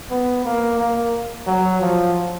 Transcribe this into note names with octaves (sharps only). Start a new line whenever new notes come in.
B3
A#3
A#3
F#3
F3